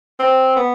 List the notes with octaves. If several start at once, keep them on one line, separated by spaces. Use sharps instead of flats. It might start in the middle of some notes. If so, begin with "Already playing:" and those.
C4
B3